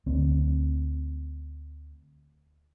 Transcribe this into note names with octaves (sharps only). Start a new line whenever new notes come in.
D2 C4